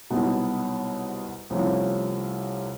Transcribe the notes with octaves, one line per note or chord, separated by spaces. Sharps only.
C2 B2 F#3 B3 D#4
C2 C3 F3 A3 C#4